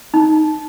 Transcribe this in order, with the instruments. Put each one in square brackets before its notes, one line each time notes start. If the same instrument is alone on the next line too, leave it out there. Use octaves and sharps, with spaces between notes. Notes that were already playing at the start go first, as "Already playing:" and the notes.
[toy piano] D#4